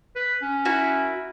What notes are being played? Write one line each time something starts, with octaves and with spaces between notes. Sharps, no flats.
B4
C#4
E4 F#4 A#4